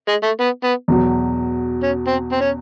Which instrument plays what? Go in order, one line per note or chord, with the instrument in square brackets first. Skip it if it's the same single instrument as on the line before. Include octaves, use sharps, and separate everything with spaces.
[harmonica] G#3
A3
B3
B3
[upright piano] E2 B2 F#3
[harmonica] C#4
C4
C4
C#4